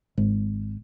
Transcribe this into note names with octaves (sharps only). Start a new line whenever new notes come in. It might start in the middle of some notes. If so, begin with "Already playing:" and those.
G#1